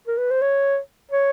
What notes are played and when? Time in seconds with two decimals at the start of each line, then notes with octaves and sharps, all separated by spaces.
0.07 A#4
0.18 B4
0.31 C5
0.41 C#5
1.11 C#5